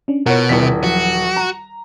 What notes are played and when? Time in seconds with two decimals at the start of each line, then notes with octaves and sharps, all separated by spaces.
0.08 C#4 D4
0.26 B2 E4 F4 A#4 C#5 F#5
0.49 D#1 D#3 E3 D5 B6
0.84 F3 F#3 F#4
1.36 A#5